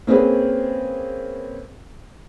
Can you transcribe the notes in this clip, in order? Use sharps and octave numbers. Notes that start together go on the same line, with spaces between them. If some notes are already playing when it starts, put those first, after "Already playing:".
A#3 C4 C#4 G#4 B4